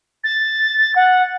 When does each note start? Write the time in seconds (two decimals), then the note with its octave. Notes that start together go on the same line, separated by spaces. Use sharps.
0.24 A6
0.95 F#5